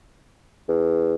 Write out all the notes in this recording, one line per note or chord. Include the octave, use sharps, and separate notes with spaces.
E2